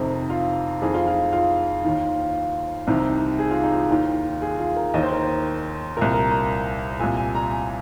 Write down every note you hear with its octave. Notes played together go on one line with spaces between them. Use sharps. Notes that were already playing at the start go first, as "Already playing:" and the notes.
Already playing: F2 C3 D#3 D#4
F4
F2 D#3 G#4
F4
F4
F4
D#2 D#3
C2 C3 D#3 D#4
G#4
F4
D#4
F4
D#2 D#3
G#4
F4
A#4
D#2 D#3 D#5
C5
A#4
C5
C2 A#2 A#4
A#4
A#5
C2 A#2 G#5
G#5
A#5
G#5